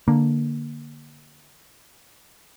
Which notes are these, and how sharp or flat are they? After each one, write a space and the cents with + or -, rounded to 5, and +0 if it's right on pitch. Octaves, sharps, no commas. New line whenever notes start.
D3 +0 A#3 +0